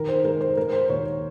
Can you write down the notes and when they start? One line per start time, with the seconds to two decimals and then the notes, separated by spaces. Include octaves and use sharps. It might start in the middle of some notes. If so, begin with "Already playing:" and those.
Already playing: D#3 A#4
0.09 C5
0.25 G#3 A#4
0.41 C5
0.57 G#3 A#4
0.73 C5
0.89 D#2 C#5